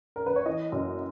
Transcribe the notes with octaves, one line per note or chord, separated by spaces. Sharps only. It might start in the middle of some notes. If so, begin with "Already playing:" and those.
A#4
B4
C#5
E3 D#5
F#2